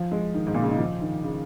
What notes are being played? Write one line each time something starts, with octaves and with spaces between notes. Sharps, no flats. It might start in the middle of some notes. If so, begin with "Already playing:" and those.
Already playing: F3
G#3
D#3
G#2
A#2
C#3
D#3
F3
D#3
C#3